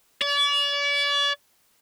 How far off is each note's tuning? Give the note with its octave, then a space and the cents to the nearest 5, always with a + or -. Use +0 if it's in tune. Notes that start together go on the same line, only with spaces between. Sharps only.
D5 -45